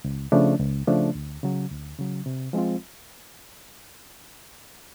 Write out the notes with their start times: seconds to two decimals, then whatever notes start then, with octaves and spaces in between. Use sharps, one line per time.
0.04 C#2
0.32 C#3 F3 A3 D4
0.60 C#2
0.87 C#3 F3 A3 D4
1.15 D2
1.43 C#3 F#3
1.71 D2
1.98 C#3 F#3
2.26 C3
2.53 F3 G#3 C4 F4